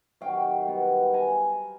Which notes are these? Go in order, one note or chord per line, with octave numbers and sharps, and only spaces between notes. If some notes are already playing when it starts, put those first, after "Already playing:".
C3 D#3 F#3 F5 G5
B2 G3 B3
G#5 A#5